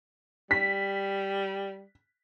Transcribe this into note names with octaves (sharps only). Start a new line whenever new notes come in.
G3 B6